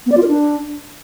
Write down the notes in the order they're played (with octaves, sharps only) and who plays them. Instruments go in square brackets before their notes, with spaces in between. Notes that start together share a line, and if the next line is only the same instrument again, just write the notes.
[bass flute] B3
D5
F4
A#4
D4